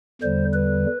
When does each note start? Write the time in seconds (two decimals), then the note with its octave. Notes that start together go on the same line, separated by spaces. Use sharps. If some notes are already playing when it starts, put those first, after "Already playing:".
0.22 E2 D3 G3 C5
0.53 B4